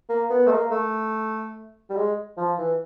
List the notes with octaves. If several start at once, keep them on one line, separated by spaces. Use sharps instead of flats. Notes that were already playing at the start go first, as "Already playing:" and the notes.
A#3
B3
A3
A#3
A3
G3
G#3
F3
E3